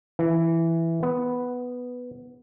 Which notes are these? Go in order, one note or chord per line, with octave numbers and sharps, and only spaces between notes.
E3
B3